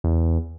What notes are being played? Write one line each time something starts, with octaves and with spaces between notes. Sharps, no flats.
E2